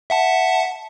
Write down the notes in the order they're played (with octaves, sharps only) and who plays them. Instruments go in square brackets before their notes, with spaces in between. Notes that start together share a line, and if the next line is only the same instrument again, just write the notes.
[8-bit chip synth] E5 F#5 A5